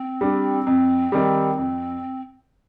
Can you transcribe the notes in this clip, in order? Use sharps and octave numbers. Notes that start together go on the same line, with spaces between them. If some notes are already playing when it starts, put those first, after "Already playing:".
Already playing: C4
G3 D4
F2
D#3 G3
F2